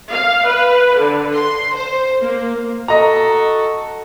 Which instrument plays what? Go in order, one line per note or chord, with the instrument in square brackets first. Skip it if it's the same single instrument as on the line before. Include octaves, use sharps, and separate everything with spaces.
[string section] F5
B4
D3
C6
C5
A#3
[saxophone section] F#4 A4 [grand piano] D#5 A#5